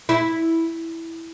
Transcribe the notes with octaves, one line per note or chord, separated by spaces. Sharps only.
E4